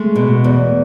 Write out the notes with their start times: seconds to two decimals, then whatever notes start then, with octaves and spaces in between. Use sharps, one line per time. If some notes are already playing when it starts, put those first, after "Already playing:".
Already playing: G#3 A3
0.16 B2
0.44 E2